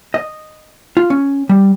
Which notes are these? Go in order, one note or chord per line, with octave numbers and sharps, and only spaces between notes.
D#5
F4
C#4
G3